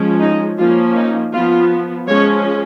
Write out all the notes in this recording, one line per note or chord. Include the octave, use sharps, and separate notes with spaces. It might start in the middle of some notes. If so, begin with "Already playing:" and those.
Already playing: F3 G#3 C#4
D#4
F3 A#3 C#4 F4
D#4
F3 B3 F4
F3 G#3 C#4 C#5